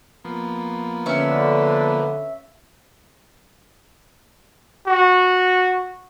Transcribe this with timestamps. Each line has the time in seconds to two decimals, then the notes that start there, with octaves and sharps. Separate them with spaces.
0.25 F3 A#3 B3
1.06 D3 C#4 B4 E5
4.87 F#4